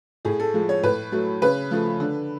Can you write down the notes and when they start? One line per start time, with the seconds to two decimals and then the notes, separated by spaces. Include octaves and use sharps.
0.25 A2 G#4
0.40 A4
0.54 F3 G#3
0.69 C#5
0.83 A2 B4
1.12 F#3 A3
1.42 C#3 B4
1.71 F3 A3
2.00 D3